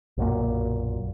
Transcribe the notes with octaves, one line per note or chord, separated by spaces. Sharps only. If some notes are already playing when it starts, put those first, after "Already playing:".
B1 F#2 A#2 A#3